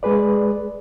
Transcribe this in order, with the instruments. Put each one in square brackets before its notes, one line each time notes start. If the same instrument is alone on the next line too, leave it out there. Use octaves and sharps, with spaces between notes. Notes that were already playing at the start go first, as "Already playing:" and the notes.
[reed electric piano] G#3 G#4 B4 D5